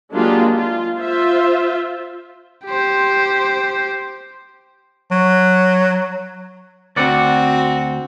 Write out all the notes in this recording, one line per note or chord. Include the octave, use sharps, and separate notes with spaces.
F#3 G#3 A#3 D4 F4 G4
F4
F4 C5 E5
G4 C5
F#3
D2 C4 F#4 D5 F#5